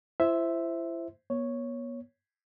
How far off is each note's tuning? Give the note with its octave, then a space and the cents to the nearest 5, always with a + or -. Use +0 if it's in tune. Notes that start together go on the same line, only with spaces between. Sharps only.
E4 +35 C5 -5 E5 +0
B3 -40 C#5 +0